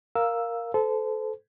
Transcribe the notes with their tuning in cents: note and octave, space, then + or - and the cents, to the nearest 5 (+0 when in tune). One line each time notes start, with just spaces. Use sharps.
A#4 +0 F5 +0 E6 +0
A4 -20 C5 -35